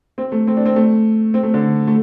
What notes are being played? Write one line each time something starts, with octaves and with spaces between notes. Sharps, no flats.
C4
A3
C4
D4
C4
A3
C4
A3
D3
A3